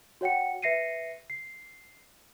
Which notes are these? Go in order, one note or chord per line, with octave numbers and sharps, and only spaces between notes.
F#4 C#5 F#5 G5 C#7
B4 E5 A#6 C7 C#7 D#7
C7